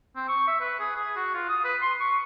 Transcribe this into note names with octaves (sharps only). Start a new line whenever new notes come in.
C4
C#6
E5
B4
G#4
G#4
F#4
F4
D#6
B4
C6
C#6